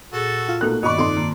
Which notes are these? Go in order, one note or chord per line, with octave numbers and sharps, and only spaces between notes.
A#2 F#4 G#4 A4 A6
F4
B2 A3 A#3 D#4 A#4 F#6
G2 B2 D#3 D5 D#5 B5 C#6
F2 D#4 C6
D#3 A#3 D6